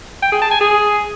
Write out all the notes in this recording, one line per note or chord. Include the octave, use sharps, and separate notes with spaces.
G5
G#4
A5
G#5
G#4